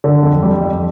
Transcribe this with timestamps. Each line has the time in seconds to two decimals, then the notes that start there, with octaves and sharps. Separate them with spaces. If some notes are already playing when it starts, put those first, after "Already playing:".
0.04 D3
0.23 F2
0.43 G3
0.61 F2